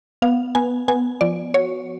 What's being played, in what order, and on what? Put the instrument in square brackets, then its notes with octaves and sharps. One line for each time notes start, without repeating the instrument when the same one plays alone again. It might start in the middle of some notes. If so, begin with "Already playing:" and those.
[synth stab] B3 [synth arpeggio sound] F5
[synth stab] B3 [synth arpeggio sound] G#5
[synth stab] B3 [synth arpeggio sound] G#5
[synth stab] F3 [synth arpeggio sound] D5
[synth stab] F#4 [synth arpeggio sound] C#5